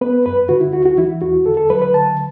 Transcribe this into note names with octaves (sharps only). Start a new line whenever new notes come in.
B3 B4
F#2 B4
D3 F#4
E4
D2 F#4
F#4
E3 E4
E2 F#4
D3 A4
A4
F#3 B4
B4
D3 A5